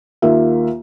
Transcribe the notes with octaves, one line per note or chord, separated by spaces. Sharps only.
D#2 A#3 F4 E5